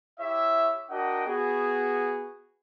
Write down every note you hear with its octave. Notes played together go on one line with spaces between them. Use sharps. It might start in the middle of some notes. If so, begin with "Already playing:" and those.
E4 G4 C#5 E5
D4 F#4 A#4 D#5 F#5 G5
B3 F#4 G#4